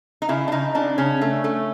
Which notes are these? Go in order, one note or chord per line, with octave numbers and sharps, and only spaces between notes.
D#4
C#3 E4
D4
C#3 D#4
C#3 D4
C#3 C#4
A3
A3